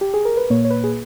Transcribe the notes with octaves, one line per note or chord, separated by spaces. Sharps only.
G4
G#4
A#4
B4
A#2 A#3 C#5
C#5
B4
G#4